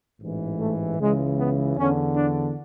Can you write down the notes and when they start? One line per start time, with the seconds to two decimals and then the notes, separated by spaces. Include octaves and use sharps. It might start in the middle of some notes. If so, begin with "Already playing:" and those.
0.20 A1 G#2 E3
0.60 A3
0.98 C#2 C#3 E3 G#3
1.37 B3
1.77 E2 D3 C#4
2.15 D4